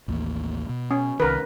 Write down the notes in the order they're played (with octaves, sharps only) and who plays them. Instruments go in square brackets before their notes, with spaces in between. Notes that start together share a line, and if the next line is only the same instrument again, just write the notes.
[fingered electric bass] A1 D#2 A#3
B2
[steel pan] C#4
[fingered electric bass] C2 D#3 [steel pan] A#4 B4